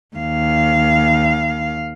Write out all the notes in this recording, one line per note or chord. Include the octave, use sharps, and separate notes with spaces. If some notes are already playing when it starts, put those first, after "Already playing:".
D#2 F5